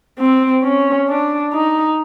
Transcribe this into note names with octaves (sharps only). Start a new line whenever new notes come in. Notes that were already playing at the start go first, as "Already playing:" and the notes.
C4
C#4
D4
D#4